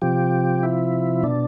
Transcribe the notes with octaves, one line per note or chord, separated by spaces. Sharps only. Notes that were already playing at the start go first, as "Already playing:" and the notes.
C3 F3 G4
E4
B2 D4